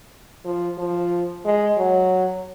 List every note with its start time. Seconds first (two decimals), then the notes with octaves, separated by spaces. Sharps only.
0.45 F3
0.78 F3
1.45 G#3
1.78 F#3